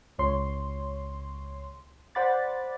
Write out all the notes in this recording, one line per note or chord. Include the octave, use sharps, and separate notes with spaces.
C#2 C#5 C6
C5 D5 F#5 B5 D6 A6